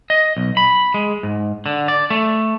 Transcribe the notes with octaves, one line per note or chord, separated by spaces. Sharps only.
D#5
B1
B5
G#3
G#2
D3
D5
A3